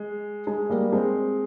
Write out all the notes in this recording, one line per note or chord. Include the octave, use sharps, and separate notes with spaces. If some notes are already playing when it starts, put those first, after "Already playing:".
Already playing: G#3
G#3
G3 A#3
G#3 C4